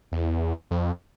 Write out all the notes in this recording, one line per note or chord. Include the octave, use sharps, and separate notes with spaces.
E2
F2